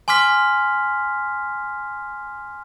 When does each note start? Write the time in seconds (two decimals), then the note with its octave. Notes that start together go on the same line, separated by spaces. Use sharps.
0.08 G#5 C6 D6 F6 B6